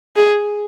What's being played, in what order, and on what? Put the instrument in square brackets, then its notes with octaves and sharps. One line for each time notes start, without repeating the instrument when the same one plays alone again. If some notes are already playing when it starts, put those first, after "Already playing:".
[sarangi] G#4